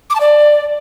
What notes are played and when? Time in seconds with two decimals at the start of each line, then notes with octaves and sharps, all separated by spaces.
0.10 D6
0.15 A5
0.20 D5